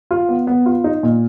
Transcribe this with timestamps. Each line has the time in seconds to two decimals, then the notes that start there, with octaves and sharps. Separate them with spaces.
0.11 F4
0.29 B3
0.47 B3
0.66 F4
0.84 D#4
1.03 A#2